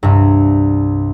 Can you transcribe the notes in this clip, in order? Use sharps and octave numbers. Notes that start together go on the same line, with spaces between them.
C2 G2